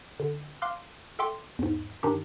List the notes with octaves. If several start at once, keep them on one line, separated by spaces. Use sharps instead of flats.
D3
F5 C6 D6 F6 F#6
A4 E5 G5 C6 D6
E2 G#2
G2 D#3 D4 D#4 G4